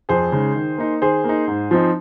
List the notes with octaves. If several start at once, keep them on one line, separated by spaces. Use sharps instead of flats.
F2 G#4 C5
C#3 G#3 D#4
D#3
A#3 D#4
D#3 G#4 C5
A#3 D#4
G#2
F3 C4 D#4